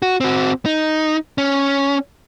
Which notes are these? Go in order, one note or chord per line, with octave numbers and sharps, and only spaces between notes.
F#4
C4 F#4
D#4
C#4